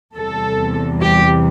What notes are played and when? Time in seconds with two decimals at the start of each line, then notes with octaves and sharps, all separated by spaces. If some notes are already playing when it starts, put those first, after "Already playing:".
0.15 E2 C3 G3 A4
1.02 G4